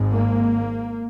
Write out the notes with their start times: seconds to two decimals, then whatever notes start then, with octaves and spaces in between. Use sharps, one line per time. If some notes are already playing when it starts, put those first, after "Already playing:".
Already playing: G#1 G#2
0.10 A#3